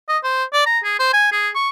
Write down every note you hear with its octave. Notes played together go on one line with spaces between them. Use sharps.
D#5
C5
D5
A#5
G#4
C5
G#5
G#4
C#6